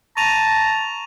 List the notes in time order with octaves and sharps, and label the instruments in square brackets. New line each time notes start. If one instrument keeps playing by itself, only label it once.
[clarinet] A5 [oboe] A#5 [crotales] C#6 D#7 F7